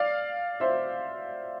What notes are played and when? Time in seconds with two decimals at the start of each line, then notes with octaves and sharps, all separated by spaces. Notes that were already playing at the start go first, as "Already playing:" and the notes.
Already playing: D5 F5
0.60 C5 E5